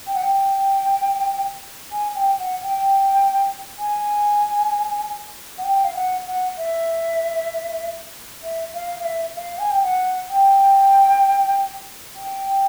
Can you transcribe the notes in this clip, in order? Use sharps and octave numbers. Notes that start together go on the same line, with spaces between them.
G5
F#5
G5
G#5
G5
F#5
G5
G#5
F#5
G5
F5
F#5
F#5
E5
E5
F5
F5
E5
F5
G#5
G5
F#5
G5
G5